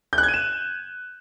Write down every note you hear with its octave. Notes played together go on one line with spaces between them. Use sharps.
G6
F#6
G#6
D#7
E7